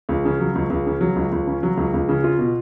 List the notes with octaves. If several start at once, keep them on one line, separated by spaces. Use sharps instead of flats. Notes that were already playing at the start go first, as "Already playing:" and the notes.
C#2
C#3
F#3
C#2
C#2
C#3
F#3
C#2
C#2
C#3
F#3
C#2
C#2
C#3
F4
B2